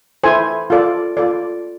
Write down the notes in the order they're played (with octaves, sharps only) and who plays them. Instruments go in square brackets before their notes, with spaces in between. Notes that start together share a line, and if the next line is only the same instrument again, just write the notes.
[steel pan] E4 A4 C5 G#5
F4 A4 D5
F4 A4 D5